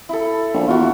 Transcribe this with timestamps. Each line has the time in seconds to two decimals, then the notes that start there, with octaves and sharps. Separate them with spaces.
0.09 E4 A4
0.54 A#1
0.68 E2 F4 F#4